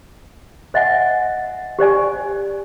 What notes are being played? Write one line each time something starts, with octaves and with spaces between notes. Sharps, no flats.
C5 D#5 E5 F#5 G#5
G4 C5 D5 G#5